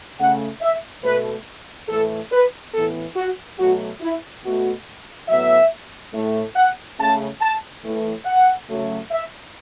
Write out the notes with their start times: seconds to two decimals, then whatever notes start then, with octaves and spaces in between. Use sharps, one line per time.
0.18 C#3 A3 F#5
0.61 E5
1.03 B2 A3 B4
1.89 A2 E3 A3 A4
2.32 B4
2.73 A2 E3 B3 A4
3.16 F#4
3.59 B2 F#3 A3 F#4
4.01 E4
4.43 B2 A3 F#4
5.28 A2 F#3 B3 E5
6.13 A2 A3
6.56 F#5
6.99 C#3 A3 A5
7.41 A5
7.84 A2 E3 A3
8.25 F#5
8.69 C#3 F#3 A3
9.11 E5